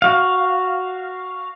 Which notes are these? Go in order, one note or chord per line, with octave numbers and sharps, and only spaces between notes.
F#4 F5